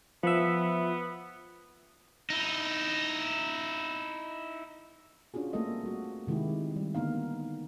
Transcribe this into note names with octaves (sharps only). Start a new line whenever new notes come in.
F3 B3 E5
D#4 E4
C#4 D4 F4 F#4 G#4
A3 A#3 C4 A4 D#5
G3 A3 F#4
C3 D#3 G#3 E4 G4
G3
D3 A#3 B3 D#4 F5